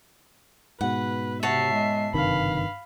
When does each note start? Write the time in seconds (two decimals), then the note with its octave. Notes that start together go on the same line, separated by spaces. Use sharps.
0.81 G#2 B2 B4 F#5
1.43 C3 F#4 C#5 E5 A5 C7
1.73 G#3
2.14 F#1 G2 C3 D#3 F5 B5